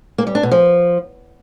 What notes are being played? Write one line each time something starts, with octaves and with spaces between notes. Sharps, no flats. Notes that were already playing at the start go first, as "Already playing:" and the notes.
A#3
G3
D4
B2
F3